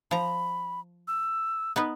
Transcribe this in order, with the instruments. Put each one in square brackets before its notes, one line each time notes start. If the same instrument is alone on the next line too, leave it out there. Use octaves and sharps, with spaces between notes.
[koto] F3 A#5 [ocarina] B5
[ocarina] E6
[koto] B3 D#4 B4